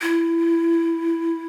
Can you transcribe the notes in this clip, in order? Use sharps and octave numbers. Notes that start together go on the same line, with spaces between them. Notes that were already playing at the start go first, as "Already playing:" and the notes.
E4